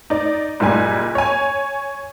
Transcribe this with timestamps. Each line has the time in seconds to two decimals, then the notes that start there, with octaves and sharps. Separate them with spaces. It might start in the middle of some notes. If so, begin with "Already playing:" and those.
0.10 D#4 D5
0.60 F#1 A#2 G3 G#5
1.15 C#5 G#5